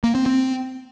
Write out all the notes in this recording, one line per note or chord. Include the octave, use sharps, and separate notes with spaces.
A#3
C4
C4